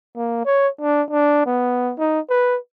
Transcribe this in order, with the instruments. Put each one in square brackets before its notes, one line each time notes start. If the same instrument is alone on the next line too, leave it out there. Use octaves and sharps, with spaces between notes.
[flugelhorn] A#3
C#5
D4
D4
B3
D#4
B4